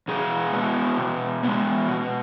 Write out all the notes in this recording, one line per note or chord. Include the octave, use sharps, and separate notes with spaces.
B2 G#4
G#3 B3
B2
G#3 B3
B2